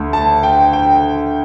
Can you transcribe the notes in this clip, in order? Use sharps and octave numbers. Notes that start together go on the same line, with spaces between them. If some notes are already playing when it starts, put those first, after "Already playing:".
Already playing: D2 D3 A3
A5
G5
G5